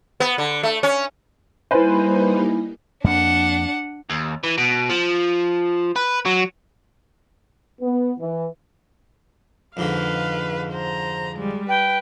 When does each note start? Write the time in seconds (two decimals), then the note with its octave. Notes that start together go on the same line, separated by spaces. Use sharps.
0.20 B3
0.38 D3
0.63 A3
0.83 C#4
1.71 G3 A#3 D#4 E4 B4 C5 G#5
3.04 F2 A#3 D4 F#5
4.10 D#2
4.43 E3
4.58 B2
4.89 F3
5.96 B4
6.25 F#3
7.81 B3
8.20 E3
9.77 F2 G#2 D3 B4 F5
10.72 C5 A#5
11.36 G3 G#3
11.69 B4 G5